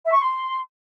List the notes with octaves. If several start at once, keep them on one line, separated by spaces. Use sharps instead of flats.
E5
C#6
C6